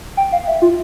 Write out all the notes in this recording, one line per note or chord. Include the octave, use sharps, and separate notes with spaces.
G5
F5
E5
F4